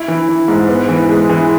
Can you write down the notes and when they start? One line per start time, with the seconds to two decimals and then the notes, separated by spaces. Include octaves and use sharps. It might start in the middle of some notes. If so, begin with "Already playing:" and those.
Already playing: E4
0.08 E3
0.28 E3
0.48 G#2
0.69 B3
0.89 E3
1.09 G#3
1.29 E3